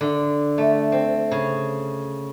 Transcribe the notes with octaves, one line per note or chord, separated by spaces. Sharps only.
D3
A3
C4
C#3